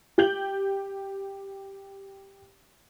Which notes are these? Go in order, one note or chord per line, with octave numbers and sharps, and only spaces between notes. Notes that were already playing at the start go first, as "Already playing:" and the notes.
G4 G6 F#7